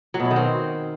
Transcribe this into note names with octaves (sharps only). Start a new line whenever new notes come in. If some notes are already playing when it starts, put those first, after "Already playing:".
F#3
B2
E4
D#3
C4